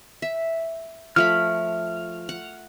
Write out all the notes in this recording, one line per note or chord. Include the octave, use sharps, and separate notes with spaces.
E5
F3 A3 B5 F6
F#5